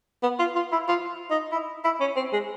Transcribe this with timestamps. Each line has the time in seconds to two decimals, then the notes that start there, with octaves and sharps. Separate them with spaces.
0.23 B3
0.39 F4
0.56 F4
0.72 E4
0.88 F4
1.31 D#4
1.52 E4
1.84 E4
2.00 C#4
2.16 C4
2.33 G#3